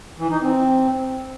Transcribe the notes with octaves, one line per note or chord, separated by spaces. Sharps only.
E3
D#4
C4